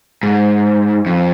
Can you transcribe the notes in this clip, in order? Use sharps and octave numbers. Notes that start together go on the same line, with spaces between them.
G#2
F2